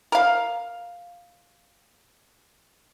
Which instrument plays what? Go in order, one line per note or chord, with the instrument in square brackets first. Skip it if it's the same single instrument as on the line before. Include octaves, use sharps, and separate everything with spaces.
[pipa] A#4 F5